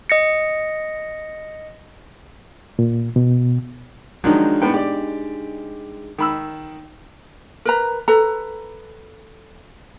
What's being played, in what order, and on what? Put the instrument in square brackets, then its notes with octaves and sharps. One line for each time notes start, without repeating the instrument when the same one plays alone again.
[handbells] D#5 A#6 C#7
[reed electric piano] A#2
B2
[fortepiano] D#3 F3 F#3 [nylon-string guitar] G#3 D4 D#4
[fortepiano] A2 B3 G5
G4 D5
D#3 B5 E6
[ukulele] A#4 B4 A#5
A4 B4 A#5